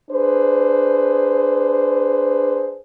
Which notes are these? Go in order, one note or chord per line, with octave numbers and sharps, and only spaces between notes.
D4 G#4 B4 C5